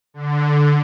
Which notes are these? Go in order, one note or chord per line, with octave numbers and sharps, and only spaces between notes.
D3